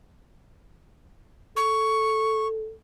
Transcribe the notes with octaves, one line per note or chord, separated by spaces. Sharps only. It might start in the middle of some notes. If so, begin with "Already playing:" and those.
A4 C#6